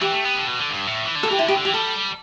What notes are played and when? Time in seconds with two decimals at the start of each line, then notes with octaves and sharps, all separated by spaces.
0.01 E3 G4
0.12 A3
0.24 B3
0.36 D3
0.47 B2
0.59 D3
0.70 G2
0.87 A2
1.05 E3
1.16 D3
1.23 A4
1.28 E3 G4
1.39 D3 E4
1.47 B2 G4
1.56 D3
1.65 E3 G4
1.74 G3 A4